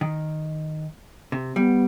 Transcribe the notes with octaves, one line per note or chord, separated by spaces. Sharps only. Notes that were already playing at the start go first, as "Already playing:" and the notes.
D#3
C3
G3 B3